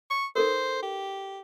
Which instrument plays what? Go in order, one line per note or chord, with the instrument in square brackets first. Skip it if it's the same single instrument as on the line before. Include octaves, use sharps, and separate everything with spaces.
[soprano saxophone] C#6
[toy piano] D#4 A4 A#4 [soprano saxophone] C5
[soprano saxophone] G4